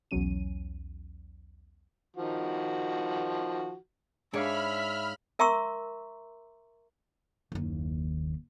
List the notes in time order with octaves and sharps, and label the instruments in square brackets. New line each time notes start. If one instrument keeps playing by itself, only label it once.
[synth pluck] B1 E2 F#3 C#4 D#7
[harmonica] D#3 F3 F#4
[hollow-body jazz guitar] G#2 D4 [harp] G#4 C#5 F5 [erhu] E5 [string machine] B5 F6
[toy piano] A#4 E5 A#5 C6 C#6 E6
[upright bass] F#1 D#2